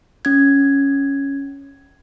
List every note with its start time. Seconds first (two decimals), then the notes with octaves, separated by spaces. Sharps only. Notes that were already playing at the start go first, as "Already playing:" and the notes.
0.25 C#4 G#6